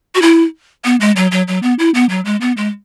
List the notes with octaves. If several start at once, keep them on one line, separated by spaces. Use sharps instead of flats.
F#4
E4
B3
G#3
F#3
F#3
F#3
B3
E4
B3
F#3
G#3
B3
G#3